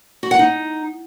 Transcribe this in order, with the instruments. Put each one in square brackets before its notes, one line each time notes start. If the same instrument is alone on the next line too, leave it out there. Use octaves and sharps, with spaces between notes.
[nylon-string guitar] F#4
F#5
D#4